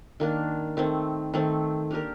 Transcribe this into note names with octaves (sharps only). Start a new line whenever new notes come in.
D#3 A#3 D4
D#3 A3 C4
D#3 A3 C4
A#3 D4 G4 A#4